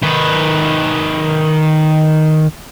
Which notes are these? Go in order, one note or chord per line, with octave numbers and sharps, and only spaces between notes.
D#3 B4